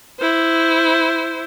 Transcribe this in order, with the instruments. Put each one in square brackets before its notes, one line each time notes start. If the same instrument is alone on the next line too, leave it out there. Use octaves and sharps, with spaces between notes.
[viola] E4 C5